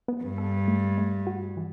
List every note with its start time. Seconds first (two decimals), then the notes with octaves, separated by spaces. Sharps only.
0.08 B3
0.23 G2
0.38 A4
0.68 A3
0.98 A3
1.27 F#4
1.57 E3